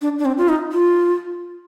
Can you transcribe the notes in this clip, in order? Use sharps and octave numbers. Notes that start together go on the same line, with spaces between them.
D4
D4
C4
F4
D#4
F4